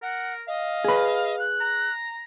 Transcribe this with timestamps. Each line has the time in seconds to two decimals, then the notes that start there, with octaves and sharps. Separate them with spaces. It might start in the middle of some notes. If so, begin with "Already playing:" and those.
0.02 A#4 F#5
0.48 D#5 F5
0.84 G#4 B4
1.39 F#6
1.60 A#5